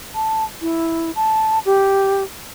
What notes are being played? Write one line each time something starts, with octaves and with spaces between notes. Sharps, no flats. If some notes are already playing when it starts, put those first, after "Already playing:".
A5
E4
A5
G4